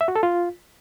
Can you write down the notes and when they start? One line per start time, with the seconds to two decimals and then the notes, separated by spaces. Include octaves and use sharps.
0.01 E5
0.08 F#4
0.16 A4
0.23 F4